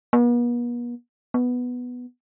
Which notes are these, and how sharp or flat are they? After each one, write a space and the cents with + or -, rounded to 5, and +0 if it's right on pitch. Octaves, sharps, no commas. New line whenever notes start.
B3 -45
B3 +0